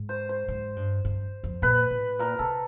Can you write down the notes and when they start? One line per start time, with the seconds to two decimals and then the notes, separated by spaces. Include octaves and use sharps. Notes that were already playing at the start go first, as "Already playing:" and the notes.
Already playing: G#2
0.09 C5
0.29 C5
0.48 G#2
0.76 G2
1.05 G2
1.44 F2
1.62 A#2 B4
1.91 A2
2.19 A#2 A#4
2.39 C3 A4